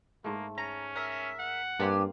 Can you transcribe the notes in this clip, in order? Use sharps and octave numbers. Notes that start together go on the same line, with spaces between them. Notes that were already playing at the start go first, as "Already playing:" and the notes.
G#2 A3 A#3
C#4 A#5
A#4 E5
F#5
G2 A#3 C4 D4 G4 G#5